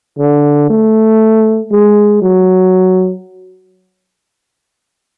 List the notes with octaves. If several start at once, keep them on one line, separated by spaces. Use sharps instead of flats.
D3
A3
G#3
F#3